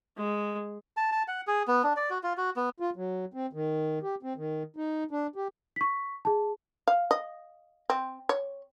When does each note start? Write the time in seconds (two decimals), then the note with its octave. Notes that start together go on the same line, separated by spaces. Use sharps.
0.17 G#3
0.97 A5
1.12 A5
1.28 F#5
1.47 G#4
1.68 B3
1.84 D4
1.96 D5
2.10 F#4
2.23 F4
2.38 F#4
2.56 B3
2.80 F4
2.96 F#3
3.34 C4
3.53 D#3
4.02 G4
4.23 C4
4.37 D#3
4.77 D#4
5.11 D4
5.36 G4
5.76 C#6 B6
6.25 G#4 A5
6.88 F5
7.11 D#5
7.90 C4
8.29 C#5